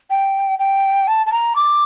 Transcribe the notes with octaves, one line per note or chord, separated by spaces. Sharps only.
G5
G5
A5
A5
A#5
D6